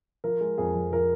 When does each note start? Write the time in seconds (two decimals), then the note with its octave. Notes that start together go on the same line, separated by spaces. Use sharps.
0.24 F3 A#4
0.41 G#3
0.58 F2 G#4
0.75 F2
0.92 F3 A#4